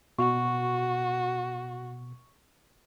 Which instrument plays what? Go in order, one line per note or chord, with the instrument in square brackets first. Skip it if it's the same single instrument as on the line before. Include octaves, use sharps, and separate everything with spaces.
[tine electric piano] B2 [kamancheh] F#4 [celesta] C#6